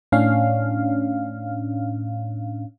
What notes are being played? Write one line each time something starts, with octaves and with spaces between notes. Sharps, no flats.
A2 C#4 D4 F5